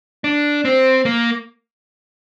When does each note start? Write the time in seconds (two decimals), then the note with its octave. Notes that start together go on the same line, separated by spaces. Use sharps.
0.24 D4
0.65 C4
1.05 A#3